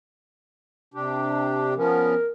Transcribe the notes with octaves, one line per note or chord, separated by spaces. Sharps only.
C3 D4 G4
F3 B3 C#4 A#4